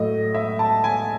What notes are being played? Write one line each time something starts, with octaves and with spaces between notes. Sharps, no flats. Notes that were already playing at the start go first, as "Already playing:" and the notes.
Already playing: A2 F#3 A3 D#5
E5
A5
G#5